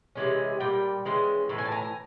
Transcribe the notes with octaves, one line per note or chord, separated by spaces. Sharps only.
C3 E3 G#3 C#4
A#2 G3 G5
E3 G#3 C#4
A2 E3
G#5
A5
G#5 A#5